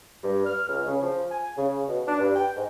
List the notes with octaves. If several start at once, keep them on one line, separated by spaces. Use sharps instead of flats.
G2
F6
C#2
C#3
F3
G#5
C#3
B2
D4
G2
G5
G#2